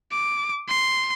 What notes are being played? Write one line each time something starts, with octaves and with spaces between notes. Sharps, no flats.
D6
C6